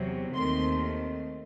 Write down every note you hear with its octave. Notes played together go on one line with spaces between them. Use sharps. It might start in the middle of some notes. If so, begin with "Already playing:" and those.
Already playing: E2 C3 F#3
D#2 D#3 A3 C4 C6